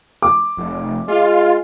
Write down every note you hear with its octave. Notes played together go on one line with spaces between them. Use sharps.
D6
F1
G#3 F4